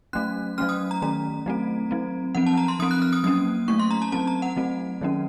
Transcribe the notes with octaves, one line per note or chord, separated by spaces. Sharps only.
F#3 A3 C#4 F#6
F#3 A3 C#4 F6
D#6
A#5
D#3 A3 C#4 A#5
F#3 A3 C4
F#3 C4
F3 C4 F#5
A5
A#5
C6
F3 C4 D#6
F#6
F6
D#6
F#3 A#3 C#4 D#6
F#3 A3 C#4 C#6
C6
A#5
A5
F#3 C4 A5
A#5
F#5
F#3 A3 C4
D#3 F#3 A#3 C#4